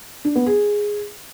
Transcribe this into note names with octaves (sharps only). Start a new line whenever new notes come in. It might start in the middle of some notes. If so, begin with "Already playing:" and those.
D4
B3
G#4